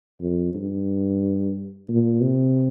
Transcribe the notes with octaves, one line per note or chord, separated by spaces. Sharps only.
F2
G2
A#2
C3